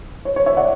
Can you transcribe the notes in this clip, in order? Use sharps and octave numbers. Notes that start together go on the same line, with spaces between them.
C#5
C#5
C#5 E5
D5 F#5